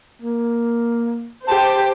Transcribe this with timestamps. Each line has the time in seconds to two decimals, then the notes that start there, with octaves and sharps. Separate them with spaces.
0.22 A#3
1.47 G4 C5 A5